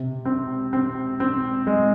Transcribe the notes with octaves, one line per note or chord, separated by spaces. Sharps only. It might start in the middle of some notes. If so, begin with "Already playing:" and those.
Already playing: C3
C4
C4
C4
G#3